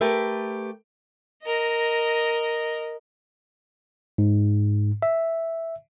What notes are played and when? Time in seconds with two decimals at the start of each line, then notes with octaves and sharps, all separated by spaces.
0.01 A3 G4 A#4 B4 E5
1.43 A#4 D#5
4.18 G#2
5.02 E5